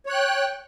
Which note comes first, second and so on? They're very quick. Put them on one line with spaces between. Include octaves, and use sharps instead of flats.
C#5 F#6 G5